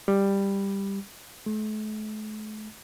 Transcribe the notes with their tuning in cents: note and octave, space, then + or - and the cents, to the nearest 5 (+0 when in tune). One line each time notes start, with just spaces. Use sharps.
G3 +10
A3 -40